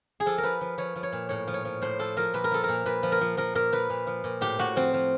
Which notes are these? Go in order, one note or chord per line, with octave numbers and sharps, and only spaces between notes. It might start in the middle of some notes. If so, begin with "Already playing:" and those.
G#4
F3 A4
A#4
F3 B4
F3
F3 C#5
F3
C#5
A#2
A2 C#5
F3
C#5
F3
A2 C5
F3 A4
F3 A#4
A#2 B4
A#4
F3 A4
A#4
A#2
A#2 B4
F3
A#4
F3
F3 A#4
A#2 A#4
F3 B4
A#2
F3
A#2
A2 G4
A2 F#4
F3 C4
F3